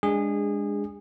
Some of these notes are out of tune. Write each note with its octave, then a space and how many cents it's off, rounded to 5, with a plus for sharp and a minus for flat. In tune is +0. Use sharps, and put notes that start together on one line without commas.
G#3 -15 D4 +0 G#4 -25